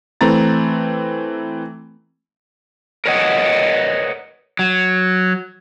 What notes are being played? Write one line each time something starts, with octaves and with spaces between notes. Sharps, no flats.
E3 A3 C4 A#5 A6
A#4 B4 C#5 D#5 F#5
F#3